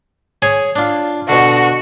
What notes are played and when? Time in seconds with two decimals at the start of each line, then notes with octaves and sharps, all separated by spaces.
0.42 G#4 C#5 G#5
0.76 D4 F4
1.29 B2 D3 F#4